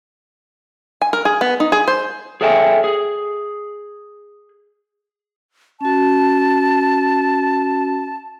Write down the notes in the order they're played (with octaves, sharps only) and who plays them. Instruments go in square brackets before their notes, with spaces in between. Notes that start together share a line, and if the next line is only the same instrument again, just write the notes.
[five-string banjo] G#5
A#4
G#4
B3
D#4
G#4
C5
[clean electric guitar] G#4 A4 C#5 E5 G5 G#5
G#4
[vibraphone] C#4 F#4 [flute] A5